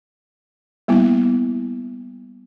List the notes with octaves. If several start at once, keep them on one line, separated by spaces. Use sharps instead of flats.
G3 A#3 B3 E4